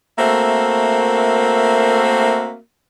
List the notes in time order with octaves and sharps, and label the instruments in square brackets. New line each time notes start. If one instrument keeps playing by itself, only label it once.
[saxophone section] A3 A#3 C4 F#4 A#4 E5